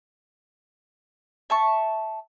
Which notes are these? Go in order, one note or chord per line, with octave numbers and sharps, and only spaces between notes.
E5 A5 C#6